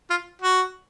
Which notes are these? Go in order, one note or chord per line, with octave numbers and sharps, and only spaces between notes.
F4
F#4